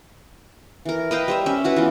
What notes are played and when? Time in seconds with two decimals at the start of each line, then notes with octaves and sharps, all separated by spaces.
0.85 E3 A#4
1.11 B4 D#5 F5 G5
1.28 G3 C5 E5
1.46 C#4 E5
1.64 E4 F#4 B4
1.76 E3 B3 F4